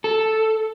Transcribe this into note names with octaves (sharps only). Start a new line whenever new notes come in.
A4